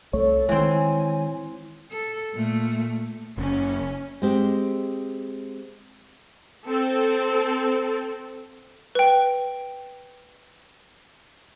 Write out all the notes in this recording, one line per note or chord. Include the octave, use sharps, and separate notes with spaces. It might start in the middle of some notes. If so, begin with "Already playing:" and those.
C2 A3 A4 C#5
D#3 E3 G#3 C4 G#5
A4
A#2 A3
F#1 C#4
G#3 C4 G4
C4 A4
B4 G5